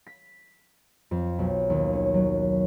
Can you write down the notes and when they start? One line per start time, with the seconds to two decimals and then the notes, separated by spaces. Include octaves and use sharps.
0.07 B6
1.11 F2
1.39 B1
1.70 D#2
1.93 C#4
2.14 F#3